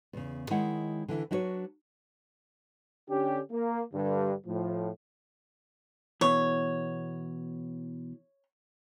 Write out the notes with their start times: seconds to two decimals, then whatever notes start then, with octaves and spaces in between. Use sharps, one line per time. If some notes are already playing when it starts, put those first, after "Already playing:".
0.13 E2 C#3
0.50 D#3 G#3 E4 C#5 F#5
1.08 D3 E3 E4
1.31 F#3 D4 E4 F#4 B4 C#5
3.10 D3 C#4 D4 G4
3.52 A#3
3.94 G2 D3
4.47 A2 F3
6.21 B2 E3 C#5